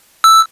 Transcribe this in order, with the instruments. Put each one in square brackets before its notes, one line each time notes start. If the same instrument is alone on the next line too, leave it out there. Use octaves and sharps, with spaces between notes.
[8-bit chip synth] E6